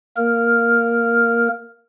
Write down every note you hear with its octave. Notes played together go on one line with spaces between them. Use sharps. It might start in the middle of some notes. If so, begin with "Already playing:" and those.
A#3 A#4 F6